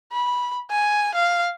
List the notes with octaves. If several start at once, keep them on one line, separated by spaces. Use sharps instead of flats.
B5
G#5
F5